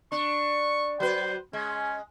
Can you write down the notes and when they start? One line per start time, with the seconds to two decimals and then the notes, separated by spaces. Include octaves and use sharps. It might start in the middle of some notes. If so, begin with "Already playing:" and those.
0.12 D4 C#6
1.00 F#3 B4 C5
1.53 G#3 C#4